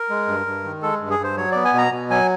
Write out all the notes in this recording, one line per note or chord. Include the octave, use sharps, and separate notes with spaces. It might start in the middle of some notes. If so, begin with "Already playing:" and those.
Already playing: A#4
G#3
G2
G2
D#3
G#3 A4
G2
G#4
G2 C5
F#3 C#5
B3 D5
G#5
B2 A#5
B2
F#3 G#5